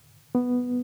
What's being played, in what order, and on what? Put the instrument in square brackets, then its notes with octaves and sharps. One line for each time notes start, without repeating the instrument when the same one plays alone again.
[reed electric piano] B3